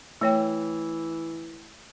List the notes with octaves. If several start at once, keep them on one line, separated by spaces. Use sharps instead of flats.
E3 A3 C#5 G5